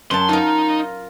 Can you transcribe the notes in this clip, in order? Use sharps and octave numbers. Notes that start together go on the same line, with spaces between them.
F#2 A5 C6
D#4 F4 A#4